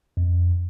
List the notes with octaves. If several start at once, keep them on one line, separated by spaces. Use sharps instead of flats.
F2